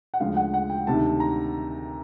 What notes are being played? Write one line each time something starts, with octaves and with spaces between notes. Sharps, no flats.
F#5
D2 C#3 F3 G#3 F5
F#5
F#5
G5
D2 C3 D#3 A5
A#5